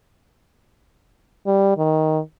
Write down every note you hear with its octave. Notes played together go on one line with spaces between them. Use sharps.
G3
D#3